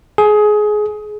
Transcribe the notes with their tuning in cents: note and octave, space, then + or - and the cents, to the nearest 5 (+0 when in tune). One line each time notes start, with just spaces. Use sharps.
G#4 +20